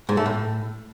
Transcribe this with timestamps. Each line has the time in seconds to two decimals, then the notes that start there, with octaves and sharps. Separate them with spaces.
0.09 G#2
0.17 A3
0.26 A2